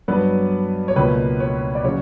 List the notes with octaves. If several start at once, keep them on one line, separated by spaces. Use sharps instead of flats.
G2 F#3 B3 B4
C#5
C#2 B2 A#3 B4
C#5
D5
C#3 F#3 C#5